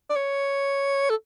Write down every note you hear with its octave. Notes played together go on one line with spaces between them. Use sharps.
D5
C#5
A4